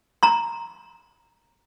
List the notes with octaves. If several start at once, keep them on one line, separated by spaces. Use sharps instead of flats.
A#5 C6